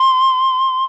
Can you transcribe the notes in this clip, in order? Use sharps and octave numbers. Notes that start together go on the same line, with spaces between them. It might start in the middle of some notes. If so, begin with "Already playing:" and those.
Already playing: C6